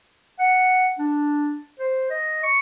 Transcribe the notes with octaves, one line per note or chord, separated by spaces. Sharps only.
F#5
D4
C5
D#5
C#6